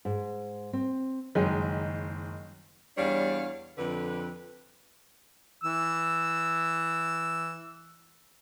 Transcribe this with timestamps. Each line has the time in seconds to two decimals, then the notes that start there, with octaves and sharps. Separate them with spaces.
0.05 G#2
0.73 C4
1.35 F#1 D#3 F#3 G#3 D#5 G#5
2.98 E2 G3 D4 C#5 F5
3.78 F2 D3 B4
5.64 E3 E6